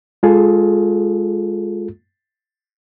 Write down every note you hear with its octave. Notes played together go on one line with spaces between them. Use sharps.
G#3 F4 G#4 A4